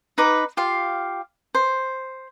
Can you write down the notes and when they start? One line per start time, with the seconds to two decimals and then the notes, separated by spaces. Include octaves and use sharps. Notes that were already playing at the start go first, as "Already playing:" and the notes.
0.18 D#4 B4 D6
0.57 F4 G4 F5
1.55 C5